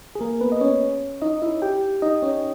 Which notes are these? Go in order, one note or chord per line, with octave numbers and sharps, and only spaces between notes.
G#4
A#3 A#4
B3 B4
D#5
C#4 C#5
D#4 D#5
E4 E5
G4 G5
D#4 D#5
C#4 C#5